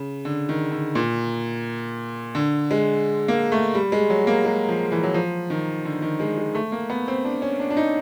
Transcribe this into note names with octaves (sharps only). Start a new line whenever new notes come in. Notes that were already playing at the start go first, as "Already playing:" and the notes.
Already playing: C#3
D3
D#3
D3
A#2
D3
G#3
A#3
A3
G3
G#3
F#3
A#3
G#3
F3
E3
F#3
F3
D#3
D3
D#3
G#3
G#3
A3
A#3
B3
C4
D4
C#4
D4
D4
D#4